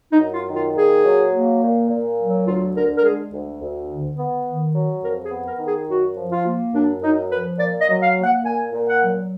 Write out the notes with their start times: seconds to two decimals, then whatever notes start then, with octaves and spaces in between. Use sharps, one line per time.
0.12 D#4
0.19 F#2
0.33 F4
0.48 D#3
0.55 F4
0.76 A#2 G#4
1.04 F#3
1.33 A#3
1.62 A#2
1.90 A#2
2.19 F#3
2.46 D2 F4
2.75 D3 A#4
2.96 A#4
3.03 G#3 G#4
3.33 D2
3.61 D2
3.89 D3
4.18 B3
4.46 D#3
4.74 F#3
5.03 F2 A#4
5.25 G#4
5.31 B3
5.46 A#4
5.59 D#3
5.67 G#4
5.88 F#2 F#4
6.17 F3
6.31 F4
6.46 A#3
6.73 F#2 D4
7.02 F#2 D#4
7.31 F3 B4
7.58 A#2 D5
7.80 D#5
7.87 F#3
8.02 F5
8.16 A#3
8.23 F#5
8.44 A#2 G#5
8.73 A#2
8.87 F#5
9.02 F#3